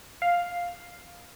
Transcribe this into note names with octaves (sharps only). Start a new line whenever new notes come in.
F5